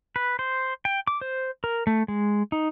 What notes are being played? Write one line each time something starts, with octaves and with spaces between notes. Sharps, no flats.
B4
C5
G5
D6
C5
A#4
A3
G#3
D#4